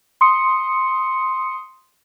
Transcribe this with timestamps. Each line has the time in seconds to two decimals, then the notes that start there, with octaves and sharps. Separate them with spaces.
0.21 C6 D#6 C#7